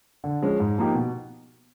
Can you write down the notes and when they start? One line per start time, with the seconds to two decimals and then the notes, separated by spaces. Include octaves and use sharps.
0.24 D3
0.42 F3 G#3 C#4
0.60 G#2
0.78 F3 A#3 D#4 G4
0.94 B2